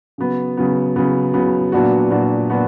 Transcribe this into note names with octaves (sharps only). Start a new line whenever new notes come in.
C#3 F#3 B3
C#3 F#3 B3
C#3 F#3 B3
C#3 F#3 B3
A#2 F#3 B3 D4 F#4
A#2 F#3 B3 D4 F#4
A#2 F#3 B3 D4 F#4